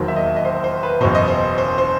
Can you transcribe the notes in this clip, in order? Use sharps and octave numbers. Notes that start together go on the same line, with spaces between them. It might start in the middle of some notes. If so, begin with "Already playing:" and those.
Already playing: E1 D#2 D#3 F#3 C5
E5
D#5
D#5
C5
C5
B4
F#1 E2 B2 C5
D#5
C5
C5
C5